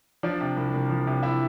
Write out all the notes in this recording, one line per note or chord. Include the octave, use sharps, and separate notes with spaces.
F3 D4 D5
C3
C2
C2
F3
C3
E4 E5